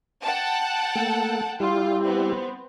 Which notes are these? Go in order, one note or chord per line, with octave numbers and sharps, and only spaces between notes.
F#5 G5 A5
A3 A#3 A4
G3 E4 F4 G4
B3 C4